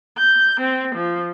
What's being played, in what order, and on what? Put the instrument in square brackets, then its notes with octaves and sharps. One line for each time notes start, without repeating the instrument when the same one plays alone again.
[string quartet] G6
C4
F3